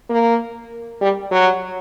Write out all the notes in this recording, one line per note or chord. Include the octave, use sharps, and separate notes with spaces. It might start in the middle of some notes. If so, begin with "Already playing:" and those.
A#3
G3
F#3